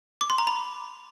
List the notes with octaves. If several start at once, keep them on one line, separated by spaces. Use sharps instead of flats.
D6
C6
A#5
B5